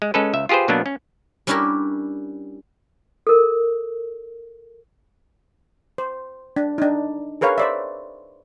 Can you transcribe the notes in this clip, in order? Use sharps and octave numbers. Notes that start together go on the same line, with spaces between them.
G#3
G#3 C#4 A4 B4
C#2 E5
F4 G4 G#4 B4 C5
B2 F#3 A#3 B3 D4
C#4
G3 C#4 D4 E4 G4 A#4
A4 A#4
C5
D4
D4 D#4
G#4 A#4 B4 C#5 F5
C5 D5 E5